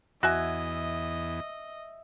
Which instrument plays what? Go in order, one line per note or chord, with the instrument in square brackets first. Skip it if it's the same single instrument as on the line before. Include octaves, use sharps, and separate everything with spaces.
[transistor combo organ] E2 [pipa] F#4 G#5 [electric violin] D#5 [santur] E5